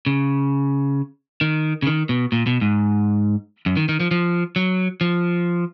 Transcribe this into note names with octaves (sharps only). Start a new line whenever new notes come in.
C#3
D#3
C#3
D#3
B2
A#2
B2
G#2
F#2
D#3
D#3
F3
F3
F#3
F3